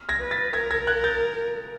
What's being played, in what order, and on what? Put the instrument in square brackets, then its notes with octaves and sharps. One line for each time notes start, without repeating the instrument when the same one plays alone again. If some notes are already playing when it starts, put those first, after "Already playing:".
Already playing: [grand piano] F6
G#6 A#6
[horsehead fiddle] B4
[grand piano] A6 B6
[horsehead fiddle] A#4 [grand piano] G#6 A#6
[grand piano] G#6 A#6
F#6 G#6
G6 A6